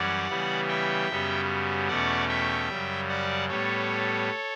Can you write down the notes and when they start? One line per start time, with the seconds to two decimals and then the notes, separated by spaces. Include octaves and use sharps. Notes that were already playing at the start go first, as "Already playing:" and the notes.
Already playing: F#2 E3 G3 C#4 D5 F#5
0.29 C#3 E3 G3 B3
0.69 E5 G5
1.08 F#2 C#3 G3 B3
1.88 E2 B2 A3 C#4 D5 F#5
2.29 E5 G5
2.68 F#2 C#3 G3
3.09 D5 F#5
3.49 A2 G3 B3 A4 C#5